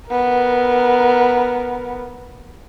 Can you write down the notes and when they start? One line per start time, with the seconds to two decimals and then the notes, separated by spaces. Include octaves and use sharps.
0.11 B3 A#4